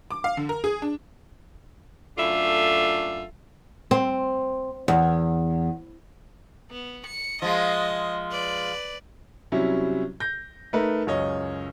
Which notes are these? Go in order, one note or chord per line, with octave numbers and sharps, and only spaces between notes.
D6
F5
D3
A#4
G#4
D4
F#2 A3 D4 F4 A4 E5
C4
E2
B3
C#7
F3 G#3 D#5
B4 D5
C3 F#3 G3 C#4 E4
G6 A#6
A3 D#4 A#4 B4
C#2 F#2 C#5 D#5